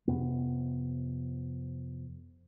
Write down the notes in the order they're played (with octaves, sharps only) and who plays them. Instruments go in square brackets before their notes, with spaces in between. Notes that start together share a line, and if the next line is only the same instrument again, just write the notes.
[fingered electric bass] F2 C3 B3